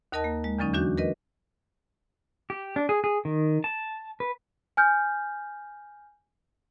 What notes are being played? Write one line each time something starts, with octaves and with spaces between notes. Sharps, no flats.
D#2 D#4 A#4 D#5 A5 A#6
A#3
G#3
E2 D3 F#3 C#4 D#4
E3 D4 F#4 G6
A#4 B4 D#5
G4
D4
G#4
G#4
D#3
A5
B4
G#5 F6 G6